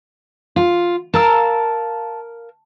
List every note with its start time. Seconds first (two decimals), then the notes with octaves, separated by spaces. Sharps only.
0.56 F4
1.14 A#4 F5 A5 E6